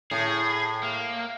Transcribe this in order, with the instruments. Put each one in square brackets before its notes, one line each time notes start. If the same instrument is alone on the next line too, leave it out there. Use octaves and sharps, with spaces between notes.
[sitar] A2 [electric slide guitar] G#4
[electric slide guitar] A#3